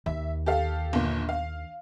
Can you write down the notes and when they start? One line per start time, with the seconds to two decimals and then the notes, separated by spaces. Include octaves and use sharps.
0.06 D#2 E5
0.46 G4 A4 F5
0.93 G1 A#2
1.29 F5